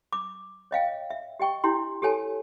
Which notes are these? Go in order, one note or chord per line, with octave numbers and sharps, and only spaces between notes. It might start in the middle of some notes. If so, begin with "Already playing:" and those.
D6
C#5 D#5 F5 G5
E5
G4 D#5 G5 C#6
D4 E4 G4 C6
G4 A4 C#5 G#5 A5